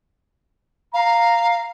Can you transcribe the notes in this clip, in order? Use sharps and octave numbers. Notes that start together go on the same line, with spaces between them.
F5 A#5